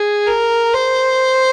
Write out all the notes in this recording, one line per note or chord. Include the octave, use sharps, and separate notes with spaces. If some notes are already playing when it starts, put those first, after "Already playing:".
Already playing: G#4
A#4
C5